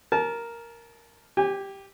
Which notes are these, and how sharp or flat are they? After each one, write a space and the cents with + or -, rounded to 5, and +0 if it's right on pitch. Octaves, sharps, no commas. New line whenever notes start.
A#4 +0 A5 -30
G4 +0 G#5 -35